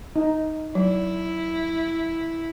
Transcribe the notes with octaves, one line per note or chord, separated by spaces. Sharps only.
D#4
F#3 E4